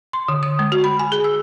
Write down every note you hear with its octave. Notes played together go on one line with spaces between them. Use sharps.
C6
D3
D#6
G#3
F#4
B5
G#5
G#4
E6